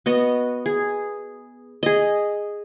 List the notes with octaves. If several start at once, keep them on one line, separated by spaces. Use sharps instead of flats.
B3 F#4 D#5
G#4
G#4 D#5